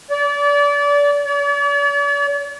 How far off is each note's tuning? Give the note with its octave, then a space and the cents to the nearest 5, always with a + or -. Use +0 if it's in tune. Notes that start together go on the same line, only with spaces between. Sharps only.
D5 -30
D5 -45